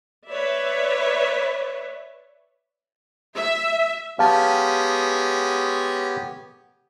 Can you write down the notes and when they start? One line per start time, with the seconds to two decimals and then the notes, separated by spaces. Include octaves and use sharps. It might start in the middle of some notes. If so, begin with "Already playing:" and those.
0.28 B4 C#5 D5 E5
3.37 E5
4.19 G#3 B3 C#4 G4 F5 A5